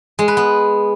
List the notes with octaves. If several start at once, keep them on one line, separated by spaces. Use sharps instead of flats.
G#3
B4
B3